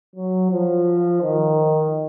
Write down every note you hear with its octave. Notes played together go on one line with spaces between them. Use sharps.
F#3
F3
D#3